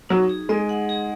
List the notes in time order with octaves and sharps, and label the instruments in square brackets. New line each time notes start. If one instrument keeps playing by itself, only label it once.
[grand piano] F#3 [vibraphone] D#4
[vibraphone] G#4
[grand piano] G#3 [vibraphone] D#5
[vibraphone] F#5
G#4